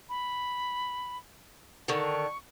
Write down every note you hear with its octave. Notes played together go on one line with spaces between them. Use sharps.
B5
D3 D#3 C#6